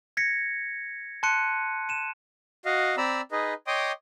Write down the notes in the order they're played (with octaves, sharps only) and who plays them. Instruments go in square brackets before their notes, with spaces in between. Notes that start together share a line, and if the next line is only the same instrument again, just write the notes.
[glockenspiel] G#6 A#6 B6 C#7
A5 C6 F#6 C#7 D#7
D#7 E7
[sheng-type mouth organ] F#4 D#5 F5
C4 D5 A#5 B5 E6
D#4 G#4 B4 D#5
C#5 D#5 G5 C6 D6 D#6